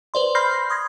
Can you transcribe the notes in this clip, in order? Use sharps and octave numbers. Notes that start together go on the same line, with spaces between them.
B4 C5 D5 C6
B5 C6 F6 G6 A#6 C7
C6 D#6 G#6 A#6